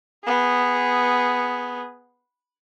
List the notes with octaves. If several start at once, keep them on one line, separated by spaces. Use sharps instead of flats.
B3 G#4